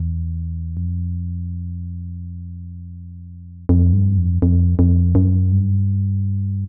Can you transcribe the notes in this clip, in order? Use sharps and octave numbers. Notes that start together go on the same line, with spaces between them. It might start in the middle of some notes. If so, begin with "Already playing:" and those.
Already playing: E2
F2
F2
G2
F2
F2
F2
F#2
G2